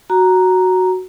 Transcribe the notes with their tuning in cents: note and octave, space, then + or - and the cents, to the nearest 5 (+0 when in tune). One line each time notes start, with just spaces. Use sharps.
F#4 +0 A#5 +0